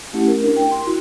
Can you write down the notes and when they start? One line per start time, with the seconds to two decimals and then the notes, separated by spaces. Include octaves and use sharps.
0.13 A3 C#4 E4 G4 F#5
0.27 A#4
0.43 D4 A#4
0.56 G5
0.71 C6
0.86 E4 F#4